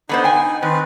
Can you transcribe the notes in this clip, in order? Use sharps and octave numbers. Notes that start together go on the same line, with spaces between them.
D3 B3 D#4 C5
G5 G#5
D#3 C4 B4